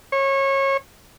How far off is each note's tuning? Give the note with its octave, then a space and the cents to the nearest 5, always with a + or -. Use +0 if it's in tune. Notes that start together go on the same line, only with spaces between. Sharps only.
C#5 -25